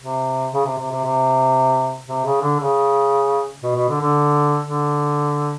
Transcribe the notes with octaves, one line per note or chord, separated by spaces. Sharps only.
C3
C#3
C3
C3
C3
C3
C3
C#3
D3
C#3
B2
B2
D3
D3
D3